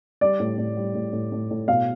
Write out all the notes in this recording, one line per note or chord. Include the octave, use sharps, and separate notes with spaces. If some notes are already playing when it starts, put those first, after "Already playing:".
G3 D5
A2
A2
G3
A2
A2
A2
A2
B2 F5